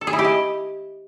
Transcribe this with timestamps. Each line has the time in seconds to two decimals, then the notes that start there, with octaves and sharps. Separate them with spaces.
0.01 A4
0.07 G#4
0.13 E4
0.19 G4
0.24 D#5